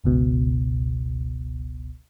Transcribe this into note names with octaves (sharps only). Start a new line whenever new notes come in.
G1 C#2 B2